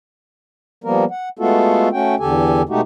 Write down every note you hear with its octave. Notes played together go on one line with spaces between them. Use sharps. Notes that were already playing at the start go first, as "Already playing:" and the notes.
F3 G3 A#3 B3 A#4
F#5
G#3 A3 B3 F4 F#4 A4
A3 C#4 F#4 G5
E2 D3 G4 A4 G#5
B2 G#3 A3 D#4 F#4 G4